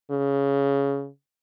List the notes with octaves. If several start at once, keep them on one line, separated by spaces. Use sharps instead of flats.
C#3